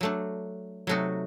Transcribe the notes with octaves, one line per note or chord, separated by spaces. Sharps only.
F#3 A3 D4
C3 F#3 A3 D#4 F#4